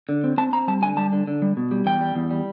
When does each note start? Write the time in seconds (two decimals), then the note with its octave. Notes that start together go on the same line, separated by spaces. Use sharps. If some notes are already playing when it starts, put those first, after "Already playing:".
0.09 D3
0.24 C4
0.38 C4 A5
0.53 C4 A#5
0.68 G3 A5
0.82 D3 G#5
0.97 G3 A5
1.12 D3
1.27 D3
1.42 G3
1.57 B2
1.71 G3
1.86 E2 G5
2.01 G3
2.15 E2
2.31 G3